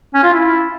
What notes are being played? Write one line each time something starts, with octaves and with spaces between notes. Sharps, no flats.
C#4
F4
E4